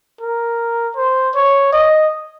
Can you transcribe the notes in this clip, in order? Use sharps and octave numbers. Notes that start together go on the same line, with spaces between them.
A#4
C5
C#5
D#5